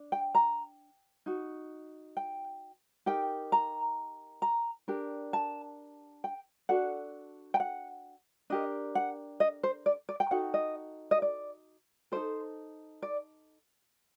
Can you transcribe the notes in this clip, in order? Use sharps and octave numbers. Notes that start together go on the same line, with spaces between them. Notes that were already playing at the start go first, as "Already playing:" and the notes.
Already playing: D4
G5
A#5
D#4 F#4
G5
D#4 G4 A#4 G5
A#5
A#5
D4 G4 A#4
A5
G5
D4 F#4 A4 F#5
G5
F#5
D4 G4 A#4 D#5
F#5
D#5
C5
D5
D5
G5
D#4 F#4 A4 F#5
D#5
D#5
D5
D#4 F#4 A4 C5
D5